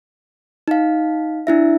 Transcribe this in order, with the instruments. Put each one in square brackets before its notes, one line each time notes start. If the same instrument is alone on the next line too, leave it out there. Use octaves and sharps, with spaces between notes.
[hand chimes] D#4 F5
D4 E4 E5